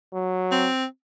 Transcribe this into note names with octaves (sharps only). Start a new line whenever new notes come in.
F#3
C4